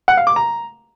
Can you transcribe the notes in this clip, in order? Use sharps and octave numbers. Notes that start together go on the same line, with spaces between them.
F#5
F5
D6
A#5